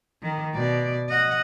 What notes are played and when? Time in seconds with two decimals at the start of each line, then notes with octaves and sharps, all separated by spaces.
0.22 D#3
0.55 B2 D5
1.10 D#5 F#5